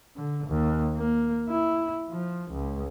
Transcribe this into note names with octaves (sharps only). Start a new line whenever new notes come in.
D3
D#2
A#3
E4
F3
C#2